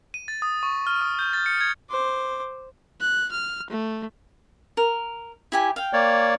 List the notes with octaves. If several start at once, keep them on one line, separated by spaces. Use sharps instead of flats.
D#7
A6
D#6
C#6
F6
D#6
G6
A6
C#7
G#6
C5 D6
F#6
F6
A3
A#4
E4 G4 G#5
F5 G5
A#3 C#5 D5